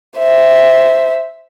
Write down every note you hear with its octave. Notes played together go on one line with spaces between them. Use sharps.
C5 E5